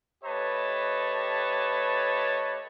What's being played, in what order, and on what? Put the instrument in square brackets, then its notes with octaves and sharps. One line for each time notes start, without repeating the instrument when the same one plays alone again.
[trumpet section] A3 G4 B4 C#5 D#5 A5